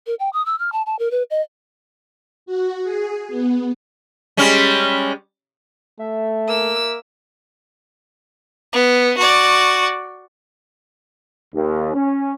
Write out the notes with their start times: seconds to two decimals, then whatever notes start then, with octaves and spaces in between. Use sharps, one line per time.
0.07 A#4
0.20 G5
0.33 D#6
0.46 E6
0.59 F6
0.72 A5
0.86 A5
0.99 A#4
1.11 B4
1.31 D#5
2.46 F#4
2.84 G#4
3.28 B3
4.37 G3 G#3 C#4
5.99 A3 E5
6.49 A#3 E6
8.72 B3
9.17 F#4 D5
11.55 D#2
11.94 C#4